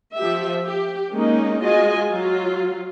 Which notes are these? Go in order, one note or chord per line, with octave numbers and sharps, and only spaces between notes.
F3 G4 E5
G4
G#3 A#3 C#4 D#4
G#3 F4 F#4 D#5 G#5
F#3 F4